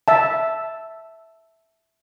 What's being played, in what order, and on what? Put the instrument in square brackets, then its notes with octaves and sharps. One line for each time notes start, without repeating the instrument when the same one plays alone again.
[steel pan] E5 A5